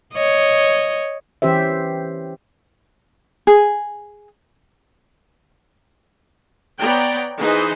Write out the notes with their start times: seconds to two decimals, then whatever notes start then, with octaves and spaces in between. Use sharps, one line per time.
0.13 C#5 D#5
1.42 E3 C#4 G4 C5 E5
3.47 G#4
6.78 B3 C#5 D5 G5 A#5
7.40 E3 D#4 G#4 C5 D#5